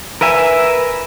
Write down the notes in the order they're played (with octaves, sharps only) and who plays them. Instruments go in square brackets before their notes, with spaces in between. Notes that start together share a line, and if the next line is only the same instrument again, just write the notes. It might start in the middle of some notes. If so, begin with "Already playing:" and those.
[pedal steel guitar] A#4 B4 E5 G#5